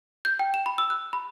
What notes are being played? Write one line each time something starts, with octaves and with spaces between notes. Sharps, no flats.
G6
G5
E7
B5
E6
F#6
B5